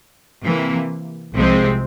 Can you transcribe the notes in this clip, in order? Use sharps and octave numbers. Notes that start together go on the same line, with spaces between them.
C3 E3 A#3
C2 C3 F3 G#3 C4